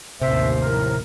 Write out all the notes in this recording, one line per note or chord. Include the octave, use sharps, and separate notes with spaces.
A1 D#2 C3 C5 E5
A2 F3 A#4